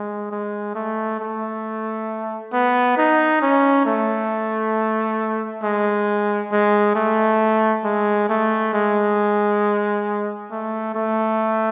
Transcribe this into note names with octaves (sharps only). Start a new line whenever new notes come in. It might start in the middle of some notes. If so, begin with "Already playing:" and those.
Already playing: G#3
G#3
A3
A3
B3
D#4
C#4
A3
G#3
G#3
A3
G#3
A3
G#3
A3
A3